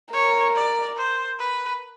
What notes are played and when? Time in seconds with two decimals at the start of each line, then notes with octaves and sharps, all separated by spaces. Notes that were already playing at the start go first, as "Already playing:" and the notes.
0.13 A#4 C#5
0.55 D5
0.97 C5
1.39 B4